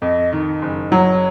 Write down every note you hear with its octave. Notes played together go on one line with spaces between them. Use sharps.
F2 D#5
D#3
F#1
F#3 C#5